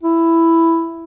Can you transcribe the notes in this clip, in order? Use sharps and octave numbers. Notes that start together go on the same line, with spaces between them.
E4